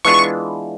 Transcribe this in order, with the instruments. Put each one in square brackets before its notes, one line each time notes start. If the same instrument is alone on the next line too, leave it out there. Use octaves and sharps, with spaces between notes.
[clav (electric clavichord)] E3 G#3 B3 D4 F4 [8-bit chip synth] C#6